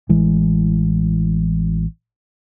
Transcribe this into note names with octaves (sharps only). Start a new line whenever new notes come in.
A1 E3 G#3